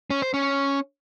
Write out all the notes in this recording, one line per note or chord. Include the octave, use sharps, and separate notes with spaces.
C#4
C5
C#4